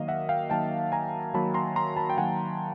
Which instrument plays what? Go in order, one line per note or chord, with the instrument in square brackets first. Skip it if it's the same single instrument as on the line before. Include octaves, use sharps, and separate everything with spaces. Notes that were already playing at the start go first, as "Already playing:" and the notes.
Already playing: [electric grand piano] D#3 F#3 A#3 D#5 F5
E5 F#5
F5 G5
D#3 F#3 A#3 G5 A5
G#5 A#5
D#3 F#3 A#3 A5 B5
A#5 C6
A#5 C6
A5 B5
G5
D#3 F#3 A#3 F#5 G#5